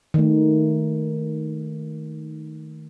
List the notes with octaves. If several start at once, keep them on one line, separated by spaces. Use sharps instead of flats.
D#3 A3